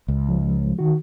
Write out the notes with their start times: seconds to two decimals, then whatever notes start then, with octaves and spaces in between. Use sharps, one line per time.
0.08 C#2
0.29 F3 G#3
0.79 D#3 F#4